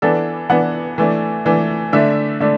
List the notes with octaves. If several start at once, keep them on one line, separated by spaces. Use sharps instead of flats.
E3 B3 D4 A4
E3 B3 D4 F#5
E3 A3 D4
E3 A3 D4
D3 A3 D4 E5
D3 A3 D4